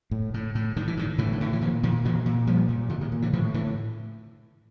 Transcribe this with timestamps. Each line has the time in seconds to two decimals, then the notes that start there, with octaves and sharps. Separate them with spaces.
0.11 A2
0.34 A2
0.55 A2
0.76 A2 D#3
0.87 E3
0.97 A2 D#3
1.18 A2 D3 E3
1.33 D3
1.41 A2 D#3
1.53 E3
1.61 A#2 D#3 F3
1.83 A#2 D#3 F3
2.05 A#2 E3 F#3
2.26 A#2
2.47 A#2 F3 G3
2.69 A#2
2.89 A#2 D3
3.01 D#3
3.12 A#2
3.22 D3 E3
3.33 A2 D#3 F3
3.54 A2 D3 E3